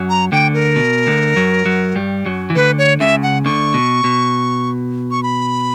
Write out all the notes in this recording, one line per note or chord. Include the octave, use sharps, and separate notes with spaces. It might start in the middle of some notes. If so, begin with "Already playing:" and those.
Already playing: F#2 F#3
A#5
D2 D3 G5
A#4
B2
D2 D3
F#2 F#3
F#2 F#3
G2 G3
F#2 F#3
E3
D2 D3 B4
C#5
C#2 C#3 E5
F#5
D2 D3 C#6
B2
B2
C#6
B5